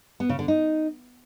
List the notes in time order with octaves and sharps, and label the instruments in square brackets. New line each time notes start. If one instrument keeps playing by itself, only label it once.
[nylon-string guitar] B3
C#3
D3
D#4